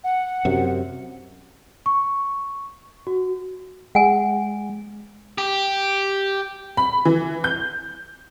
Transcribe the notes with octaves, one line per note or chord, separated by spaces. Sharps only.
F#5
F#2 C3
C#6
F#4
G#3 F#5 G#5
G4
B5
E3
G6